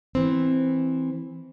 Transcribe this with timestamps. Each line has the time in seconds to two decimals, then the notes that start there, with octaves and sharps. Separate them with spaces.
0.15 E3 C4